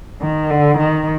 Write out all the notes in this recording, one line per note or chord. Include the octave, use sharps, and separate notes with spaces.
D#3
D3
D#3